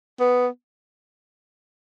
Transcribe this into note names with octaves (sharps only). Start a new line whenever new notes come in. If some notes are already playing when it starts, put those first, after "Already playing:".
B3